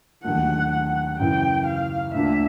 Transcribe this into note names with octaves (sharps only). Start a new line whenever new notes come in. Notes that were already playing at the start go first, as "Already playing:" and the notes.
D#2 D3 F#3 A3 F#5
F#5
F#2 C#3 E3 G5
F5
D2 D3 F3 A#3 D4 E5